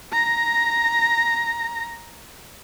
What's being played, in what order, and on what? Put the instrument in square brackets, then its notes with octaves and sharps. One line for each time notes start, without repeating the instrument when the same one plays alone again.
[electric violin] A#5 A#6